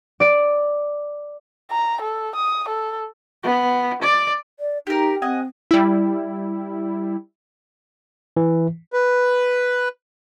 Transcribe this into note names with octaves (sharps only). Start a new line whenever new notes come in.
D5 D7
A#5
A4
D#6
A4
B3
D5
D5
D#4 G4 A#4
C4 D#5 F#5 G#5
G3 E4
E3
B4